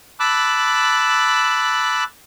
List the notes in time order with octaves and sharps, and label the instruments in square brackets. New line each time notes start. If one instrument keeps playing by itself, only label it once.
[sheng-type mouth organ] A5 B5 D6 E6 F#6